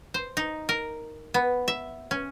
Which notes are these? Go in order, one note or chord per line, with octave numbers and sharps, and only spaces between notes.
C5
D#4
A#4
B3
E5
C#4